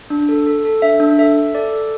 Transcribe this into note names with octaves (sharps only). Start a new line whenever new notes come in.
D4
A4
A4
A4
D4 E5
D4
A4 E5
A4
A4 D5
A4